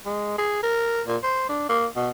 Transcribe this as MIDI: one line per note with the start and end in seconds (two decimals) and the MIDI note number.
0.06 0.35 56
0.38 0.59 68
0.63 1.02 70
1.07 1.17 46
1.23 1.46 72
1.49 1.65 62
1.69 1.86 58
1.96 2.10 47